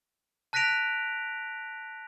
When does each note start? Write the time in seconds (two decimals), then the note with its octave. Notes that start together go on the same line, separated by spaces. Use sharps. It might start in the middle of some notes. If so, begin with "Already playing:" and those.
0.53 A5 F#6 A#6 B6 D7 F7